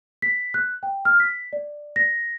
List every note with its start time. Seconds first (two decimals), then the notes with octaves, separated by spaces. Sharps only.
0.22 B6
0.54 F#6
0.83 G5
1.05 F6
1.20 B6
1.53 D5
1.96 A#6